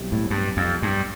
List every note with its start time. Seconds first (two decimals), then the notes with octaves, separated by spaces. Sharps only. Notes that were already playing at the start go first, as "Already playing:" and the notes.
Already playing: B1 B2 G3 C4 E4
0.12 A2
0.30 G2
0.57 F2
0.82 G2